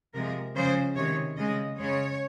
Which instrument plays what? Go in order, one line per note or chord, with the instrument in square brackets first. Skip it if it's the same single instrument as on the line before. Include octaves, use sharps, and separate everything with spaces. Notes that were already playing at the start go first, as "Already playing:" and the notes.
[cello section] C3 F3 G#3 A#4
C#3 F3 G#3 C5
C3 D#3 G#3 C#5
C#3 G#3 D#5
C#3 G#3 C#5